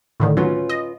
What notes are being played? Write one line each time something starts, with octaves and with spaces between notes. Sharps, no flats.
A2 D3 D#3
F#3 C#4 F4 B4
D#5